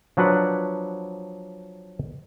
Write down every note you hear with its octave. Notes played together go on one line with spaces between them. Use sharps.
F3 F#3 D4 B4 F#5